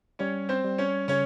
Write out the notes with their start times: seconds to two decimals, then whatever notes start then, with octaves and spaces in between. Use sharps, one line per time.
0.19 G3 C#4 C#5
0.49 C4 C5
0.64 G3
0.78 C#4 C#5
1.08 C#3 C#4 C#5